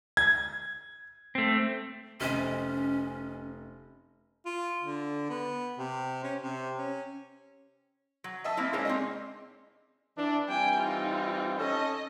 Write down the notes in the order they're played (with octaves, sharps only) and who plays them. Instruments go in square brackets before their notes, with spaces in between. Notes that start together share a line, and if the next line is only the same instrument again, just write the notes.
[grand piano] G#6
[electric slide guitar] A3 C4
[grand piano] F1 C4 D#5 [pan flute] C#4
[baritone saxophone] F4
D3
B3
C3
C#4
C3
C#4
[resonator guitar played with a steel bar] F#3
[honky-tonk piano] D#5 E5 A5
[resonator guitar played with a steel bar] A#3 C4 E4
[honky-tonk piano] G#3 C#4 [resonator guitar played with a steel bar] A#3 D#4 E4
[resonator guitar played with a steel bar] C4 D4 D#5
[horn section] E3 D4
[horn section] E3 G3 C4 [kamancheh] G5 G#5
[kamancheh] D#4 F4
[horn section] C#4 A4 [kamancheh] D#5